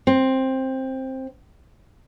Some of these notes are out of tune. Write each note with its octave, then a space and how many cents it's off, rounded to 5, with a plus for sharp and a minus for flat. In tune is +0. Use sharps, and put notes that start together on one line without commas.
C4 +10